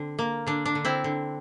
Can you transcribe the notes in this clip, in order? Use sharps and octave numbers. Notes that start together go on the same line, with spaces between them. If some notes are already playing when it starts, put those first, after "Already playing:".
Already playing: D3 C4
A#3
D3 D4
D4
D3
C4 E4
D3